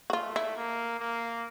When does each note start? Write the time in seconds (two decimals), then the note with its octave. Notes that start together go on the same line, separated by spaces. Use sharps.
0.10 F#4
0.13 A3 F4
0.36 E4
0.57 A#3
1.00 A#3